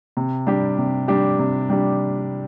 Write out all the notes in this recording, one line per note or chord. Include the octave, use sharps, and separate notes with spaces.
C3
G3 D4 G4
C3
G3 D4 G4
C3
G3 D4 G4